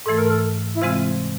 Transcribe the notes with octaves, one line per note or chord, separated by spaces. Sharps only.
G#2 E3 A3 A4
A#4
A4
E4
C3 E3 G#3 C4 F4